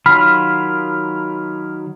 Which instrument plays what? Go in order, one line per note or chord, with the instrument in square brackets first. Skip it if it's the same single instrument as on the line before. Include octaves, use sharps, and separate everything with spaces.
[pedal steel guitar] D#3 F#3 F4 [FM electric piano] B5 F6